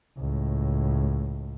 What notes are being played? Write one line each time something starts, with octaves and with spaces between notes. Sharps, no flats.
C#2 A2